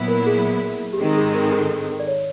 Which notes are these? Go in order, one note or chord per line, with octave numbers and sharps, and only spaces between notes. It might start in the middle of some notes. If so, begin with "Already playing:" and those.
Already playing: A#2 F#3 B3 E4 B4
A#4
G#4
G4
G#2 D#3 G#3 C4 G#4
G#4
A#4
A4
G#4
A4
D5
C#5